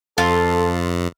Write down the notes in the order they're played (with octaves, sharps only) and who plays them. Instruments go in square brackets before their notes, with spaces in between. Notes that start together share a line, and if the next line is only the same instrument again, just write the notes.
[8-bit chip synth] F2 [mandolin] F4 [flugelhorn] A4